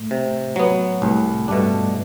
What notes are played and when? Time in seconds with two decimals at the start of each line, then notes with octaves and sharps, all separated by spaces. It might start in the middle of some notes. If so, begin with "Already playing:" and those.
Already playing: A2 A3
0.11 C3
0.56 F#3 B3
1.02 C2 A2 A3
1.48 G2 B2 G3 A3 D4